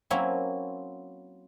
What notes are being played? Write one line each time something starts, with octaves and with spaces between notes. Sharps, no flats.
F#3 A#3 C4 C#4 E4